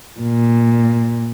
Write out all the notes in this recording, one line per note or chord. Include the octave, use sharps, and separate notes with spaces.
A#2